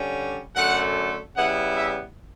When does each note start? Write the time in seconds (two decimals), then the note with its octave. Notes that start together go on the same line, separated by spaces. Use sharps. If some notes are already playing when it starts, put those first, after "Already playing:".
Already playing: D3 G3 C#4
0.55 F#2 D3 A3 F#5
1.35 C#3 G3 B3 E4 F#5
1.76 E5